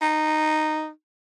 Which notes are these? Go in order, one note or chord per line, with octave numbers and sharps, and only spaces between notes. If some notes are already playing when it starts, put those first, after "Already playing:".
D#4